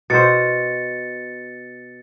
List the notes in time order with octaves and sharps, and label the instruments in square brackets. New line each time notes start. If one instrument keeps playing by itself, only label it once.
[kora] B2 C5 [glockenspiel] A6 C#7